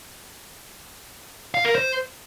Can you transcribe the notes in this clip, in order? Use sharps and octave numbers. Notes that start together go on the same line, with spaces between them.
F5
A#4
C5